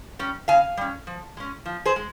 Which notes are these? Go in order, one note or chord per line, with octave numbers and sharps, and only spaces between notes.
G3 C#4
C#3 F5 G#5
G3 C#4
F3
G#3 C#4
F3
G#4 C5
G#3